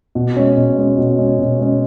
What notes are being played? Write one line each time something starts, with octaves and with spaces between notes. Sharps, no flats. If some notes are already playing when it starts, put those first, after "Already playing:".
B2
G#3 C#4
B2
G#3 C#4
B2
G#3 C#4
B2
G#3 C#4